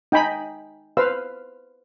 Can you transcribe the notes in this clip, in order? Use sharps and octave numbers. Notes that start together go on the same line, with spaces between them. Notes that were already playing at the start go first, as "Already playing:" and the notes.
D#4 G5 G#5 B5
B4 C5 F5 E6